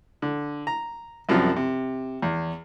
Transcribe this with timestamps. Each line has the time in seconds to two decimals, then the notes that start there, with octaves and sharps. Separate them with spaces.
0.22 D3
0.67 A#5
1.29 C2 F#2 C3 F3
1.56 C3
2.22 E2